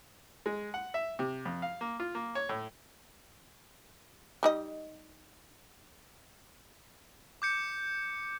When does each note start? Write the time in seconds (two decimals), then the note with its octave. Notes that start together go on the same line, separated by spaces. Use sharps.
0.46 G#3
0.74 F#5
0.94 E5
1.19 C3
1.45 F2
1.62 F5
1.81 A#3
2.00 F4
2.15 A#3
2.35 C#5
2.49 A2
4.43 G3 D#4 D#5
7.42 D6 G6 C#7